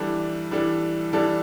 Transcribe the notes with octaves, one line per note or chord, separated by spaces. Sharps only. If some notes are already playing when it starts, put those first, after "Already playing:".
Already playing: E3 G3 D4 A4
E3 G3 D4 A4
E3 G3 D4 A4